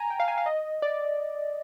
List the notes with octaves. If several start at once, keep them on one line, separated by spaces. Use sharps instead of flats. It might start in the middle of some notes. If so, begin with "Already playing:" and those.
Already playing: G#5 A#5
G5
F5
G#5
F5
D#5
D5